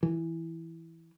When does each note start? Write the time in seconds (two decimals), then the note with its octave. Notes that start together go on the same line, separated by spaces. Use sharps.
0.03 E3